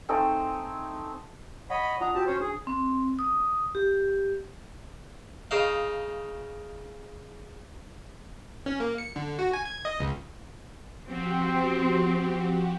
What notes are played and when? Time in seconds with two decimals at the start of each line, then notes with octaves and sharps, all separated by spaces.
0.09 A3 C4 D#4 G#4
1.70 C#5 D#5 F#5 B5
2.01 D4 F4 F#5 A#5 D#6
2.15 C4 F#4 G4 A5
2.27 C#4 C5 C#5
2.40 D4 G#4
2.67 C4
3.19 D#6
3.75 G4
5.51 C#3 D#4 F5
8.66 C#4
8.80 A#3
8.98 C#7
9.16 D3
9.39 F#4
9.53 G#5
9.65 G#6
9.85 D#5
10.00 C#2
11.07 F3 C4 F#4 G4